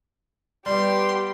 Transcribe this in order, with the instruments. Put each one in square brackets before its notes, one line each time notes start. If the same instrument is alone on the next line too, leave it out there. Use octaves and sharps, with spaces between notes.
[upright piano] G3 [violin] B3 G4 [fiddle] C6